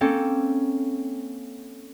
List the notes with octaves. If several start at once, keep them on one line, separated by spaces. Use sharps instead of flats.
A#3 C4 C#4 A4